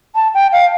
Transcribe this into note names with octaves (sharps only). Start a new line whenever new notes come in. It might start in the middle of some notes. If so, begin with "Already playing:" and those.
A5
G5
F5